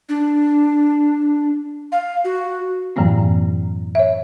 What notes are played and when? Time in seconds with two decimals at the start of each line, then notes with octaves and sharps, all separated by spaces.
0.09 D4
1.92 F5
2.25 F#4
2.96 F#2 A2 E3 F#3 A#3 C4
3.95 C#5 E5